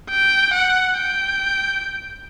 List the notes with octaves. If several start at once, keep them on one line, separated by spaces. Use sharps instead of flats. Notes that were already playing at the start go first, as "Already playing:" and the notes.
G5
F#5
G5